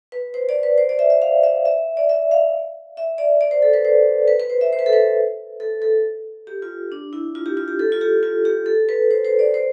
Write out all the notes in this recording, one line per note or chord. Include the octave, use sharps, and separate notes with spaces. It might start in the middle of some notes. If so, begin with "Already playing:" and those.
B4
C5
D5
B4
C5
D5
E5
E5
F5
E5
E5
D5
E5
F5
E5
D5
D5
C5
A4
B4
C5
B4
B4
C5
E5
C5
B4
A4
B4
A4
A4
G4
F4
D4
E4
F4
G4
F4
G4
A4
F4
G4
F4
G4
A4
B4
C5
C5
D5
C5